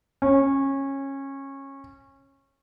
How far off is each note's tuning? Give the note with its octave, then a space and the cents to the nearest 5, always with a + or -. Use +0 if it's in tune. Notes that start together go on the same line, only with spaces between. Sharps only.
C#4 -20